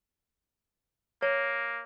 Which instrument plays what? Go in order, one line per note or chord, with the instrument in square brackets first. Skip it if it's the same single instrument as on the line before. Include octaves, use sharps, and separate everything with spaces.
[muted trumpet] A#3 [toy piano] C#5